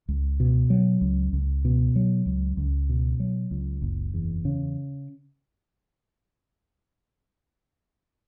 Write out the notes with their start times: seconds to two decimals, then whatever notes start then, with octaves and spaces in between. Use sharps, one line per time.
0.08 C#2
0.40 B2
0.70 F#3
1.01 C#2
1.33 C#2
1.65 B2
1.96 F#3
2.26 C#2
2.57 C#2
2.89 B2
3.20 F#3
3.51 C#2
3.82 F#1
4.14 E2
4.45 C#3